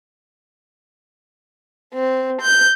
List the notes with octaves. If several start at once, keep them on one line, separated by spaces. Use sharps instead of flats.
C4
G6